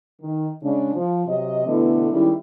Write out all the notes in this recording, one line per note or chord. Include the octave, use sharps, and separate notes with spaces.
D#3
C#3 G#3 D4
F3
C3 F#3 D#5
B2 D3 E3 A3 B3 E4
D#3 G3 G#3 C#4 E4